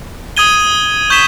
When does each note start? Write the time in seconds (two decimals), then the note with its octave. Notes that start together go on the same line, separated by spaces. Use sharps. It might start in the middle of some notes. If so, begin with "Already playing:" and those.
0.37 D#6 G#6 D#7 G7
1.10 C#6 G6 B6 E7 G7